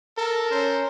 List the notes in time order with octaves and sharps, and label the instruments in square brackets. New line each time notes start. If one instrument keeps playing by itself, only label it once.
[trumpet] A4 [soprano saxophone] A#4
[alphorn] C#4 [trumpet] C5